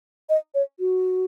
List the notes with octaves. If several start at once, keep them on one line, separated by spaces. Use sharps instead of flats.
D#5
C#5
F#4